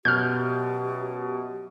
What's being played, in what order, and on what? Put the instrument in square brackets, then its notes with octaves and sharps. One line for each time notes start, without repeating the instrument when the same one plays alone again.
[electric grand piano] F#2 B2 [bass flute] G4 [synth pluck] F6 G6